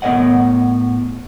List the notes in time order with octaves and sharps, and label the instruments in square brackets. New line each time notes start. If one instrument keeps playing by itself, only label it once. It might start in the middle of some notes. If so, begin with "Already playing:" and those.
[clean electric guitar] A2 B3 A#4 C#5 D#5 F#5